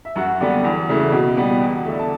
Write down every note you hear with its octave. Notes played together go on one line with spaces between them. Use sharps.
E5
F#2 F#4 F#5
D3 G3 B3
E2
C#3 E3 A3
B2
G3 B3
E2
D3 A3
A5